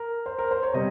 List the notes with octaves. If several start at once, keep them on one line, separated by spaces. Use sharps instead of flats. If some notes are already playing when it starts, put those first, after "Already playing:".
Already playing: A#4
C5
A#4
C5
C#5
C3 G3 D#5